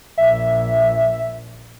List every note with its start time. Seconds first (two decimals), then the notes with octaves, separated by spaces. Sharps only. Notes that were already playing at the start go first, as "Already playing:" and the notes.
0.18 A#1 E5